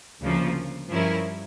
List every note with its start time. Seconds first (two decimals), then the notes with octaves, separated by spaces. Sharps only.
0.21 D2 C#3 F3 A#3
0.89 G2 F3 C#4 E4 A#4